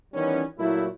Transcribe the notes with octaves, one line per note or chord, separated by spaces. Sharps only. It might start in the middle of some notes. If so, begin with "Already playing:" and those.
D#3 E3 G3 B3 C#4
A#2 F#3 A3 E4